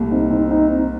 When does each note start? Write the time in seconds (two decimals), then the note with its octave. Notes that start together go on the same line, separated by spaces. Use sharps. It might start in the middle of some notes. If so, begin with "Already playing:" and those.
Already playing: C2 A#2 A3
0.11 C4 D#4
0.30 C4 D#4
0.51 C4 D#4